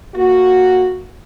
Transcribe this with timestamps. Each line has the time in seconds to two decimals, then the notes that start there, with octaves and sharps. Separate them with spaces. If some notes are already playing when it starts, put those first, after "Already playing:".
0.15 A#3 F#4